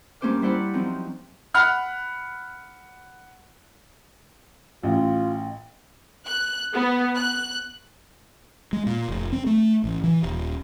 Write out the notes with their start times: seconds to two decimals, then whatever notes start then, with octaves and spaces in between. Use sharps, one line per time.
0.21 G2 A#3 C#4 C5 D6 F6
0.42 G3 E4 C5 D5 F#5 B5
0.74 F3 F#3 C4 D#4
1.54 F#5 B5 F6 F#6
4.83 A1 F4
6.26 F#6
6.74 B3
7.16 F#6
8.73 G#3
8.86 A#2
9.09 F1
9.33 C4
9.46 A3
9.84 A1
10.04 E3
10.23 D#1